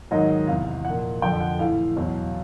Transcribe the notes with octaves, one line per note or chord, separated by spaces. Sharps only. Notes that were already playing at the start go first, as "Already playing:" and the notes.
G#2 D#3 F#3 D#5
E2 C3 E3 F5
A#2 F3 F#5
F2 D3 F3 G5
F#5
A2 E3 F5
E2 B2 F#3